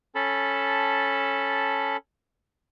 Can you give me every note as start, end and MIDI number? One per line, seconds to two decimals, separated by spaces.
0.15 1.97 61
0.15 1.97 69
0.15 1.97 81
0.15 1.97 83